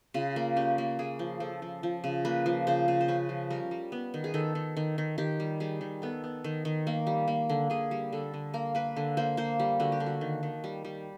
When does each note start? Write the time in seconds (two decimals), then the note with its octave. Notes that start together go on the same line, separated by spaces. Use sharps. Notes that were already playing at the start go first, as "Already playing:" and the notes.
0.14 C#3 F4
0.36 A#3
0.56 C#4 G4
0.78 A#3
0.99 A#3 G#4
1.19 F3
1.40 F3 A4
1.62 F3
1.83 F3
2.04 C#3
2.25 A#3 B4
2.46 F3
2.67 C#3 C5
2.88 C#3
3.01 C5
3.08 C#4 B4
3.29 F3
3.50 G3 A#4
3.71 G3
3.92 B3
4.14 D#3
4.24 G#4
4.34 D#3 A4
4.55 D#3
4.77 D#3
4.98 D#3
5.18 D#3 G4
5.40 G3
5.60 G3 G#4
5.81 D#3
6.02 B3 A4
6.24 B3
6.44 D#3
6.65 D#3
6.87 A#3
7.07 G3
7.28 A#3
7.50 D3
7.70 D3 G#4
7.91 G3
8.13 D3 A4
8.34 D3
8.54 A#3 A#4
8.75 A#3 B4
8.96 D3
9.17 A#3 C5
9.37 A#3 C5
9.60 G3
9.80 D3 F#4
9.92 G4
10.00 D3
10.06 F#4
10.21 D#3
10.43 D#3
10.64 G3
10.85 G3